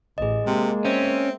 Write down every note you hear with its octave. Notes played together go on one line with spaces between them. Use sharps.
A1 G#4 D#5
C3 G#3 A#3
C4 C#4 E5